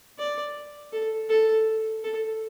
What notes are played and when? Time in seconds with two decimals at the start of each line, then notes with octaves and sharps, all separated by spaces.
0.19 D5
0.93 A4
1.29 A4
2.04 A4